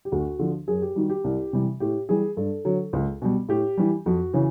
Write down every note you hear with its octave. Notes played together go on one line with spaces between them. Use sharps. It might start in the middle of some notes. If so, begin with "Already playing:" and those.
G4
D2 F#4
D3 F3
F#2 G#4
G4
D#3 G3 F#4
G4
C2
C3 E3 G3
A2 G4
E3 G3 G#4
G2 A4
D3 F#3
C#2
B2 G3
A2 G4
E3 G3
F2 F#4
C#3 E3